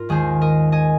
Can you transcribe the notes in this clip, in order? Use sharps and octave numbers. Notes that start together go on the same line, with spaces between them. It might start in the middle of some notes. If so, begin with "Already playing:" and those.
Already playing: G#2 F4 A#4
D#2 D#3 G#3 G#4 C5
A#4 D#5
D#5 G#5